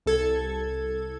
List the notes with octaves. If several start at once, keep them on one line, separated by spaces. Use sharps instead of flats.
C2 A4 G#6